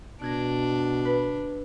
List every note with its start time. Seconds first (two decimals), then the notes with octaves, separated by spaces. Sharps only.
0.22 B2 D4 F#6 G#6 A#6
1.05 B4